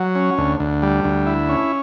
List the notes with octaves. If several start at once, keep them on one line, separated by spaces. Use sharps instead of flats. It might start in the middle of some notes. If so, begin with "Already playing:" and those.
Already playing: F#3
C#4
D2
D2
G3
D2
E4
C#4